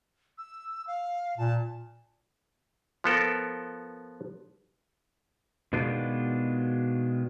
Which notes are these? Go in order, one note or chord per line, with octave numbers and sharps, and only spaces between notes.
E6
F5
A#2 A5
F3 B3 A4 A#4
B2 D#3 G#3 B3 D4 F4